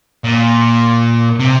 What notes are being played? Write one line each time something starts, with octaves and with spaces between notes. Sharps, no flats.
A#2
C3